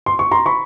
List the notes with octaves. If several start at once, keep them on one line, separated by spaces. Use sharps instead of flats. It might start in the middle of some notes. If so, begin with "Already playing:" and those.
C6
C#6
A#5 C6
B5 C#6